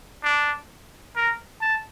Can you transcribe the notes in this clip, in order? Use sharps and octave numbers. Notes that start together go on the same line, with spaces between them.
D4
A#4
A5